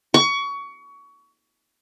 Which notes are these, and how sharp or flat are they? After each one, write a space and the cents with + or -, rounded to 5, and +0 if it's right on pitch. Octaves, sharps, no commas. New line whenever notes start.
C#6 +25